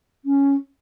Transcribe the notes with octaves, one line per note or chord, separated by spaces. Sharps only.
C#4